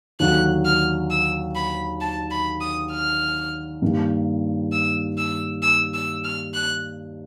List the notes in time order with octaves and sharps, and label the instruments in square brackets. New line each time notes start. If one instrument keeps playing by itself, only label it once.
[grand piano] D#2 D3 F#3 [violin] F#6
[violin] F6
E6
B5
A5
B5
D#6
F6
[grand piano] G2 D#3 G3 A#3
[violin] E6
E6
E6
E6
F6
F#6